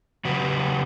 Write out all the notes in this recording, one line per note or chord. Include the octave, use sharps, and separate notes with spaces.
C#3 F#3 F#4 G4 B4